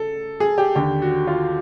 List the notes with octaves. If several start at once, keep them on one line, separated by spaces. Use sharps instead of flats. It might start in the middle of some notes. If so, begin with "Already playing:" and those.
Already playing: C#3 A4
G#4
G4
D#2 D3 G4
F#4
F4